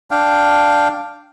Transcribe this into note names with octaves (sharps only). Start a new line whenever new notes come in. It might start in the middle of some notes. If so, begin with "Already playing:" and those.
D4 F5 G5